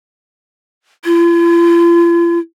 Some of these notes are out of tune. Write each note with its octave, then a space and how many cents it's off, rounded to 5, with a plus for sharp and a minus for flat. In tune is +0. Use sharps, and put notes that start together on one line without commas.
F4 -45